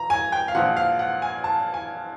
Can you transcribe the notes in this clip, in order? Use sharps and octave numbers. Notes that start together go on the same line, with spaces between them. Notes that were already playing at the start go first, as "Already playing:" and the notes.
Already playing: A#5
G#5
G5
F5
A#1 A#2 F3 F#5
F5
F#5
G#5
A5
G#5